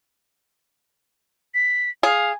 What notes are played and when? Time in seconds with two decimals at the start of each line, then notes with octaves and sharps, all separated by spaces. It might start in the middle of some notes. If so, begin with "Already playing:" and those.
1.54 B6
2.03 G#4 F5